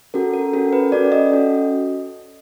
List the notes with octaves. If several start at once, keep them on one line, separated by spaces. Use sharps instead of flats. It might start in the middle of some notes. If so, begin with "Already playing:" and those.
C#4 F#4 A4 A#4
A#4
C#4 F#4 A4 A#4
B4
C#4 F#4 A4 D5
D#5
C#4 F#4 A4